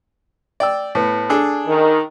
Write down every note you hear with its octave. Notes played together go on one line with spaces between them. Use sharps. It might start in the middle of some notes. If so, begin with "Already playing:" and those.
D5 G5 E6
A2 B3
D4 G#4 A4
D#3